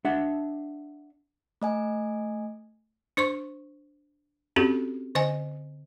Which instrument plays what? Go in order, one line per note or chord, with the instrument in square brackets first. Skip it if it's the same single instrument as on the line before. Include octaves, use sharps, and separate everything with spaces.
[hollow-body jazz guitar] D4 E5 F#5
[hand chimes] A3 D#5 G#5
[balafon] D4 C5 C6 C#6
C4 C#4 F#4 G4 A4
D3 C5 D#5 G#5